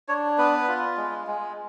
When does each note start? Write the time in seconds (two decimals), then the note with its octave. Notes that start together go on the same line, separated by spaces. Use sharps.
0.08 D4 C#5
0.38 B3 B4
0.68 F4
0.97 G#3
1.27 G#3